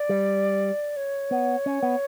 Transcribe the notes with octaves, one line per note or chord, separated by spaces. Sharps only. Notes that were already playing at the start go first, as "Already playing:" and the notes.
Already playing: D5
G3
C#5
B3
C#4
B3